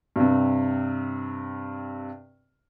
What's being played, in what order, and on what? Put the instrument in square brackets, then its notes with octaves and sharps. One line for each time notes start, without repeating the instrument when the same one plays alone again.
[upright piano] G2 C3